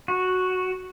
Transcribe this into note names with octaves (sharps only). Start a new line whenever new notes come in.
F#4